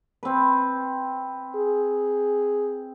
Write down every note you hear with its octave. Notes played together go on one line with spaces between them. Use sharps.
C4 B4
G#4